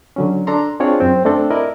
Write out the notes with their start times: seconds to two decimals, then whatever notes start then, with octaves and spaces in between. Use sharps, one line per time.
0.16 D3 F#3 C#4
0.47 D4 A4 A#5 C6
0.80 C4 D4 F4 G#4 C#5 D5
1.00 F#2 C4
1.25 A3 C4 D4 A4
1.51 E4 A#4 D5 D#5